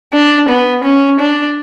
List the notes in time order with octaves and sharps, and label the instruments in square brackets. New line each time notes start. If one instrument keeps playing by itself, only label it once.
[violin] D4
B3
C#4
D4